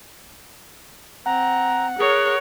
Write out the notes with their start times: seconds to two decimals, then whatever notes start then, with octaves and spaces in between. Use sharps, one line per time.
1.26 C4 F#5 A#5
1.98 G#4 A#4 C#5